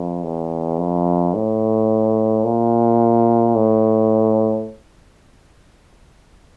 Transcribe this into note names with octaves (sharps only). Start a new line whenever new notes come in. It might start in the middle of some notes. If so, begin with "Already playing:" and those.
Already playing: F2
E2
F2
A2
A#2
A2